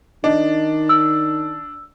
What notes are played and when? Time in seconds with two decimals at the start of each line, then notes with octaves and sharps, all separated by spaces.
0.24 D#3 D4 D#5
0.89 E6